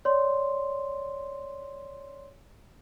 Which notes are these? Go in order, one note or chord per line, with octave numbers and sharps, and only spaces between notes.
C#5 D5 C6